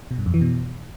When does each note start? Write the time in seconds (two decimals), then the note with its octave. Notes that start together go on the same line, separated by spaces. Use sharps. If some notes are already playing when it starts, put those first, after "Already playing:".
0.11 B2
0.18 G2
0.26 F2
0.34 E3
0.41 B2